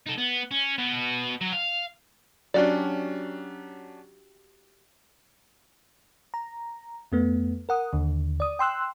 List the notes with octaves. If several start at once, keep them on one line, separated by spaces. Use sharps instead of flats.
D#4 A4
B3
C#4
B2 B3
F#3
F5
F#3 C#4 D4 F#4 G4 D5
A#5
F2 A3 B3
A#4 F#5 D#6
D#2 D3
D5 D#6
G5 C6 E6 F#6